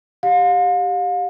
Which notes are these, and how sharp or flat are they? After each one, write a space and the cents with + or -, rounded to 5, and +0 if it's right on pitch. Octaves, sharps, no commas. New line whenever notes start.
G4 +0 F5 +40